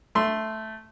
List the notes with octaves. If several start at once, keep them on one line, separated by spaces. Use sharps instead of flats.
A3 C6